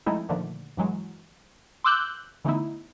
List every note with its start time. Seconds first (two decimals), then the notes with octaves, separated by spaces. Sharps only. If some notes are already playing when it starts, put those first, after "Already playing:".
0.06 F3 G#3 A3 C4 D#4 E4
0.29 A#2 D3 D#3 F3 A3
0.77 G2 E3 F#3 G#3
1.84 C6 D6 E6 F#6 G6
2.45 D3 E3 A3 B3 D#4 E4